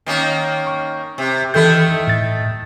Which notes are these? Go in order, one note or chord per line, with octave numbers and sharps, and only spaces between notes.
D#3 A#3 C#4
C#6
C3
D#3 E3 A3 E4 A4 G6
A2 A6